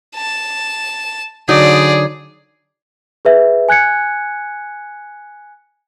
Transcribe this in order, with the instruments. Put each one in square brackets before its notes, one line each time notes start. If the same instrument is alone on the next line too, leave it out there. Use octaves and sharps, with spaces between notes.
[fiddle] A5
[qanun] D3 F#3 D#4 [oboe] G#4 [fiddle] D5
[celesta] G#4 B4 E5
G#5 F#6 G#6 C#7